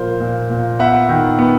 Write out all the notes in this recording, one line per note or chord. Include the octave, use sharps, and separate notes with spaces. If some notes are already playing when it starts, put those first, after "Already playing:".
Already playing: A#2 F3 A#4 C5
A#2
A#2
B3 E5 F#5
D#3
B3